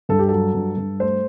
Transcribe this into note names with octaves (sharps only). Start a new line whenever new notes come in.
G2 A4
G4
F#3 A4
G2
G2
A3 C5